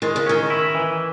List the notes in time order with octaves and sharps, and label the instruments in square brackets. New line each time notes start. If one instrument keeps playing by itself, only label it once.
[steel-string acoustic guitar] D#3 [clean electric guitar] G#3
[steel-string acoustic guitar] C#3
[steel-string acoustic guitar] D#3 [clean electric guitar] C#4
[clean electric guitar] E4
E3